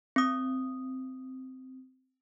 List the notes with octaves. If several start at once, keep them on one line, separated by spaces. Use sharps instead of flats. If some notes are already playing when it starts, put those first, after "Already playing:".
C4 D#6